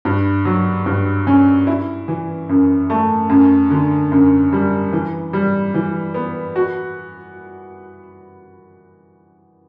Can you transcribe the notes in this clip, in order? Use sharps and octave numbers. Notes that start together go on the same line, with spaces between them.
G2
F#3
G2
C#4
E4
E3
F#2
A3
F#2
D3
F#2
G3
E3
G3
E3
B3
F#4